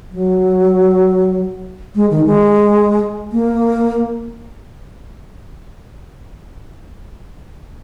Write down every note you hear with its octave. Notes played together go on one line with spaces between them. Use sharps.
F#3
G#3
D#3
G#3
A#3